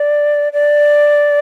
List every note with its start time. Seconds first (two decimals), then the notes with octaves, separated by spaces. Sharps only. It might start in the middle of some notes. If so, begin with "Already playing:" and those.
Already playing: D5
0.53 D5